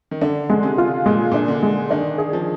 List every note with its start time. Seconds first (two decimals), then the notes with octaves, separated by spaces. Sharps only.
0.11 D#3
0.21 D3 D4
0.50 D3 G#3
0.63 C3
0.78 F4
1.06 A#2 G#3
1.32 A#2
1.34 D4
1.48 D3
1.63 G#3
1.91 D#3 D4
2.18 G#4
2.33 F3